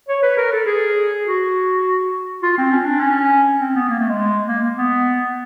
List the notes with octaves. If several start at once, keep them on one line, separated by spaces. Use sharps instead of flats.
C#5
B4
A#4
A4
G#4
F#4
F4
C4
C#4
D4
C#4
C4
B3
A#3
A3
G#3
A#3
B3